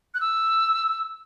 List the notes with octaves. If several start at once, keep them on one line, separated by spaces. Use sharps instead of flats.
F#6
E6